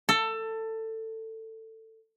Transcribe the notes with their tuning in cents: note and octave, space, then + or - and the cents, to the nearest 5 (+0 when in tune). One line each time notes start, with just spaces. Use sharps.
A4 +20